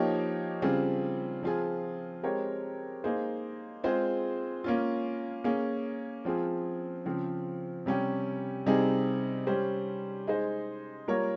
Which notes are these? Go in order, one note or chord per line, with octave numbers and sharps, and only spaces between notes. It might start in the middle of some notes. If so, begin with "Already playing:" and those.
Already playing: F3 A#3 D#4 G4 C#5
C#3 G3 C4 F4 G#4
F3 C4 F4 G#4
G#3 C4 G4 A#4 C#5
A#3 D#4 G#4 C5
G#3 C4 F4 G#4 C5
A#3 C#4 F4
A#3 C#4 G#4
F3 C4 F4 G#4
C#3 F3 C4
C3 G3 C#4 G4
C3 G3 C4 D#4 G#4
G3 C#4 G4 C5
G#3 D#4 G#4 C5
G3 A#3 F4 A#4 C#5